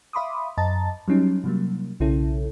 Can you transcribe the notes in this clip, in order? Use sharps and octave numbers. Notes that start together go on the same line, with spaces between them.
E5 F5 B5 C6 D6 D#6
F#2 D#5 A5 A#5 A6
F#3 G3 C#4 D#4
C3 F#3 G3 A#3
B1 C#3 C#4 E4 A4